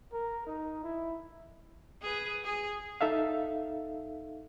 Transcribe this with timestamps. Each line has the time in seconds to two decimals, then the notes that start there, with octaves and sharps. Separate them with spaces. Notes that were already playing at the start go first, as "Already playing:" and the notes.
0.13 A#4
0.47 D#4
0.83 E4
2.02 G#4 B4
2.44 G#4
3.01 D#4 A4 E5 F5